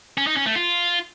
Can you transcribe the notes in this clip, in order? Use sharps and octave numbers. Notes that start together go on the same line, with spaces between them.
C#4
D#4
C#4
A3
F4